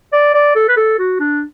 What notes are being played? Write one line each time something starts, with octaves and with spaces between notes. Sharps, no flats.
D5
D5
A4
B4
A4
F#4
D4